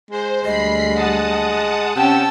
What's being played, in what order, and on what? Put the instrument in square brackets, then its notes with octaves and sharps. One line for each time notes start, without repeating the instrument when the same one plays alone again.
[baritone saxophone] G#3 [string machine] C5
[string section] D2 G3 [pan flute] D#5 [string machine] B5 C7
[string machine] F#5 A5 D#6
[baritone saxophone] C3 [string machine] C#4 [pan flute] F#5 [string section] G5 A5 E6